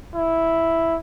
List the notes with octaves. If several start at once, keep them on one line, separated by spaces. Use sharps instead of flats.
E4